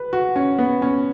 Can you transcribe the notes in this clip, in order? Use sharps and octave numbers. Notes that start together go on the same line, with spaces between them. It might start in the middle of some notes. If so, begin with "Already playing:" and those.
Already playing: B4
F#4
C#4
B3
C#4